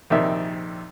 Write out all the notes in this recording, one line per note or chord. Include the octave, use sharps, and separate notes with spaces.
A#1 C3 D#3 D#4 D5 E5